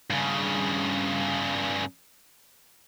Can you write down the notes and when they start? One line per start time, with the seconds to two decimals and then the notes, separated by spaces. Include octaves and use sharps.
0.10 G2 C#3